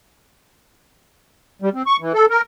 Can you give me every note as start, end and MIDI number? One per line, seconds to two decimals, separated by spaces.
1.62 1.69 55
1.74 1.82 60
1.87 1.97 85
2.00 2.13 52
2.14 2.26 69
2.30 2.41 70